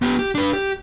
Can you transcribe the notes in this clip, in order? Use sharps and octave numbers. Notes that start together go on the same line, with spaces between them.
B3 G4
G4
D4 B4
G4